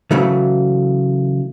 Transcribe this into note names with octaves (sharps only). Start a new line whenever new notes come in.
C#3 E3 F#3 A3